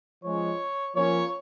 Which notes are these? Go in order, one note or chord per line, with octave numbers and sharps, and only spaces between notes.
F3 G#3 C#4 C#5
F3 A#3 C#4 C#5